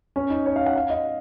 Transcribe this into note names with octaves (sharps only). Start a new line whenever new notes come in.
C#4
D#4
C#5
F5
F#5
F5
D#5